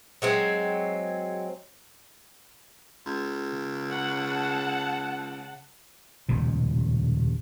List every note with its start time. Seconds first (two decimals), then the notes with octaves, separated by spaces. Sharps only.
0.22 F#3 G#3 C4
3.06 C#2
3.55 C#3
3.90 F#5 A5
6.29 D#1 C#2 B2